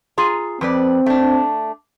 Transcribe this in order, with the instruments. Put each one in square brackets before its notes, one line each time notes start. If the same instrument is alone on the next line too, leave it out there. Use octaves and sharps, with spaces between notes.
[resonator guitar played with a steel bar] F4 G#4 A#5
[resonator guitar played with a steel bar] F2 B4 D5 [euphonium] C4
[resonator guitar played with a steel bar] A3 D4